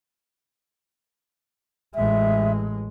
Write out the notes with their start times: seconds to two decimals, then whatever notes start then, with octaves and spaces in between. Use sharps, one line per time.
1.95 A1 G#3 E5